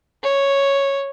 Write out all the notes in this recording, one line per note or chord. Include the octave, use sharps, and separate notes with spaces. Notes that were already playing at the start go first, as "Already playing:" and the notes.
C#5